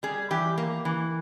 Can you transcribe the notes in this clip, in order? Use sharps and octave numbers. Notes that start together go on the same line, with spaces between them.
G3 G#4
E3 G4
A#3
E3